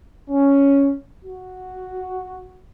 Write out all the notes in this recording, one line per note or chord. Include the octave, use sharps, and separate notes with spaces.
C#4
F#4